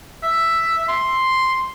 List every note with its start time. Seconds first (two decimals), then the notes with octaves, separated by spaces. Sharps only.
0.23 E5
0.88 C6